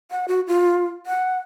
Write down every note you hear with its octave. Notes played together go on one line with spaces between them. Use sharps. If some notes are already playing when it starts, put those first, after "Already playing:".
F#5
F#4
F4
F#5